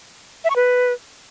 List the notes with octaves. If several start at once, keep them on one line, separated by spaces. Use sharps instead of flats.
E5
C#6
B4